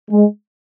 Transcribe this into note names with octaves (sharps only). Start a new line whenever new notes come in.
G#3